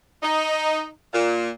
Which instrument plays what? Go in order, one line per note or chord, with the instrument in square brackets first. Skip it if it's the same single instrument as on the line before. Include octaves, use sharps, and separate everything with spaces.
[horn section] D#4
A#2